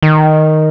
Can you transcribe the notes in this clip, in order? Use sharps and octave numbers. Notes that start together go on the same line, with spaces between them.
D#3